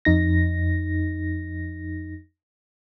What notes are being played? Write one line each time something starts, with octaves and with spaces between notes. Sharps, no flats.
F2 D#4 A#6